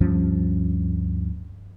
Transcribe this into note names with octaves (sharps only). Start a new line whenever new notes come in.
D2 G2 F3 C#4